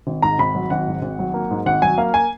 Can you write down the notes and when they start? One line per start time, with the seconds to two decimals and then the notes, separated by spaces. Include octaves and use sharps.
0.07 G#1
0.22 G#2 A#5
0.39 G#1 B5
0.55 F#3
0.70 G#1 F#5
0.87 G#2
1.02 G#1
1.19 F#3
1.34 A#3
1.50 G#2
1.66 G#1 F#5
1.82 F#3 G#5
1.98 A#3 F5
2.14 G#5